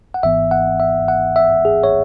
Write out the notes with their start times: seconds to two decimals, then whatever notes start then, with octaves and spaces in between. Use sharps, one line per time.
0.14 F#5
0.23 G#1 G#2 E3 B3 E5
0.51 F#5
0.80 E5
1.08 F#5
1.36 E5
1.65 G#4
1.83 C#5